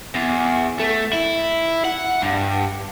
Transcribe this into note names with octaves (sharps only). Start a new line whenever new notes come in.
E2
A3
E4
F#5
G2